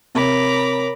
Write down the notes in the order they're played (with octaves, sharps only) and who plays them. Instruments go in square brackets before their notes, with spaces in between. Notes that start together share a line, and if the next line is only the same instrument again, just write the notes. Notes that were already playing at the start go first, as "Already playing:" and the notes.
[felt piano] C3 [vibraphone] A#4 C#5 [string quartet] A#5 B5 D6